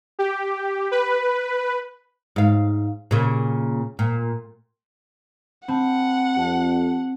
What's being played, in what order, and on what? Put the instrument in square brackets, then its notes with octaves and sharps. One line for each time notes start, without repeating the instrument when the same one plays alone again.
[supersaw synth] G4
B4
[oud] G#2 F5
A#2 C#3
A#2
[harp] C4 [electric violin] F#5 [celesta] A5 B5
[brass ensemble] F2 [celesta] G4 A5